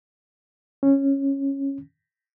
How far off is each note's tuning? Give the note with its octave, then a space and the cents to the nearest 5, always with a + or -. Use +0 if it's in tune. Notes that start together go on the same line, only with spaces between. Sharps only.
C#4 -10